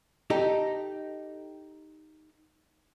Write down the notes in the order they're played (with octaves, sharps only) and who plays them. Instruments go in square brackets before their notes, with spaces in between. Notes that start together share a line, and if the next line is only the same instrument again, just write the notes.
[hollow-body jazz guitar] D#4 G4 A4